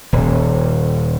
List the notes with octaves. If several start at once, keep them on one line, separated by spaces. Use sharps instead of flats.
D#1